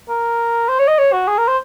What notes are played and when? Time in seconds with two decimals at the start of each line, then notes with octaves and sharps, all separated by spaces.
0.09 A#4
0.69 C5
0.79 C#5
0.88 D#5
0.99 C#5
1.12 F#4
1.28 G#4
1.38 A#4
1.48 C5